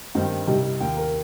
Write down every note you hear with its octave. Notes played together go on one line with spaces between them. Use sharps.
G2 D#3 C4 D#4
C2 C3 G3 D#4
D#2 D#3 A#3 G5
A#4